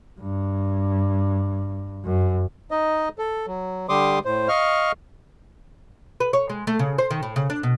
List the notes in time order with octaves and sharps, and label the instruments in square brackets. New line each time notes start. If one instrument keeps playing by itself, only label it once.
[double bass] G2
F#2
[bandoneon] D#4 D#5
A4
F#3
D3 G3 G4 C6 D6 D#6
A2 C5
D#5 F5 C#6 F6
[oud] B4
C#5
G#3
A3
C#3
C5
D#3
A2
C#3
D4
B2